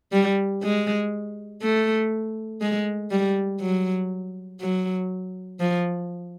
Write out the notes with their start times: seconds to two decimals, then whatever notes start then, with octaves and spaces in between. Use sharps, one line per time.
0.12 G3
0.62 G#3
1.62 A3
2.61 G#3
3.11 G3
3.60 F#3
4.60 F#3
5.60 F3